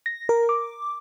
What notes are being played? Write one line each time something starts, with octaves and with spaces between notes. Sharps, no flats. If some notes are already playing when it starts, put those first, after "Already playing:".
A#6
A#4
D6